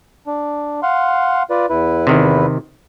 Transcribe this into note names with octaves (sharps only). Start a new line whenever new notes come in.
D4
F5 F#5 C6
F4 B4 D5
E2 E4 B4
C3 D#3